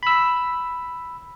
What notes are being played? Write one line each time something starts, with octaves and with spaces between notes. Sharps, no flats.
B5 E6